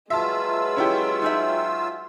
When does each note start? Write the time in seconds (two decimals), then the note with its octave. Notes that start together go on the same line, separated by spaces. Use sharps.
0.10 F#3 G#3 F4 B4 E5 A5 E6
0.76 C#4 E4 G4
1.22 D#4 G#4 E5